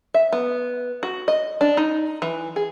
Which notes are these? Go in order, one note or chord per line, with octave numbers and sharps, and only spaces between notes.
E5
B3
F#4
D#5
D4
D#4
E3
G#4